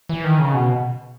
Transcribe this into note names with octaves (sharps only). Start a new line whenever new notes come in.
E3
D#3
C#3
B2